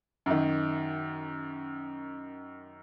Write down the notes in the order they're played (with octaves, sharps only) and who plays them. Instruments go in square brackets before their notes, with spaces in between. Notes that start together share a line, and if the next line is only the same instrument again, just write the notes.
[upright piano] F#2 D#3